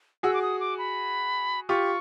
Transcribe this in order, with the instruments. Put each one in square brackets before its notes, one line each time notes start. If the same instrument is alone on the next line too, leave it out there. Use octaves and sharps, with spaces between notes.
[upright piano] F#4 G#4 [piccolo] E6
[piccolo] D6
D#6
D6
B5
[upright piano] F4 G4 [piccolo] C#6